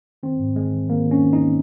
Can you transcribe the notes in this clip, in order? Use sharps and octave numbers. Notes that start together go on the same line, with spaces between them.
D#3 C4
G#2
D#3 G#3
D#3
D#3 A#3
D#3
C#4
D#3
D#4
D#3